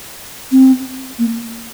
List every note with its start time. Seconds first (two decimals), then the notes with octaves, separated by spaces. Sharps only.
0.51 C4
1.19 A#3